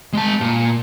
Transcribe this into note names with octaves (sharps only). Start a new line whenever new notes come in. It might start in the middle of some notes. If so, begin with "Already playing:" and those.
G#3 A5
A#2